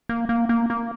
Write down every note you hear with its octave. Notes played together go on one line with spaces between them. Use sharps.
A#3
A#3
A#3
A#3